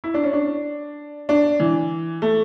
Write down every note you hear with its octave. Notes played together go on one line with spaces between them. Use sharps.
E4
D4
C#4
D4
D4
E3
A3